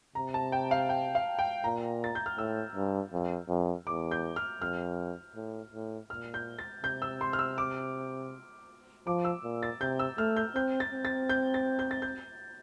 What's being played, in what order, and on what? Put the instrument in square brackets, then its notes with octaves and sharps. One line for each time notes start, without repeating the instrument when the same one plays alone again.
[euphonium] C3 [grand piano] A#5
[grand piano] A5
G5
F5
G5
F5
G5
[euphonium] A#2 [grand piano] A#5
[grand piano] A6
G6
F6
[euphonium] A2 [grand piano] E6
[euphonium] G2
F2
F2
[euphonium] E2 [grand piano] D6
[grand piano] G6
F6
[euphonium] F2 [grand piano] F6
[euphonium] A2
A2
[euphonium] A#2 [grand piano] F6
[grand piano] G6
A6
[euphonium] C3 [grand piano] G6
[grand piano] E6
C6
F6
E6
D6
[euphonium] F3 [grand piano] D6
[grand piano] E6
[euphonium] A#2
[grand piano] A6
[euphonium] C3 [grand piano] G6
[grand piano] E6
[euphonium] A3 [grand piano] F6
[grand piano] G6
[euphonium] C4 [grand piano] G6
[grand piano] A6
[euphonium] C4
[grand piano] A6
G6
A6
G6
A6
G6